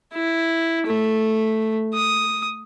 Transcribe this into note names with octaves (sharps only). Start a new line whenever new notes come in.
E4
A3
D#6